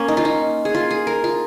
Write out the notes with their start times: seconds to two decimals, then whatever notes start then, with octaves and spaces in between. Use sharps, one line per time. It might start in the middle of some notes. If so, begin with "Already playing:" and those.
Already playing: A#3 C#4
0.08 D#4
0.17 F4
0.25 D#4
0.65 G#4
0.75 F4
0.91 G#4
1.07 A#4
1.24 F4